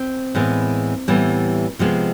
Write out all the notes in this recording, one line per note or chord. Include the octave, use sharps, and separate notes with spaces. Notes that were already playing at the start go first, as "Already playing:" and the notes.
Already playing: C4
A2 E3 G#3 B3
A2 E3 G3 B3
C3 F3 G#3 B3